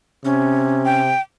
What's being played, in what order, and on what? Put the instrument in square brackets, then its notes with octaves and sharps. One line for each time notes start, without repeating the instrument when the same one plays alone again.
[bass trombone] C3 [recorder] C#4
[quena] G5